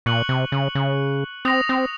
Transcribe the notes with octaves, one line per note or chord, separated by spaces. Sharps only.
A#2 C#6 F#6 C#7 F#7
C3
C#3
C#3
C4 D#6 A#6 F7
C4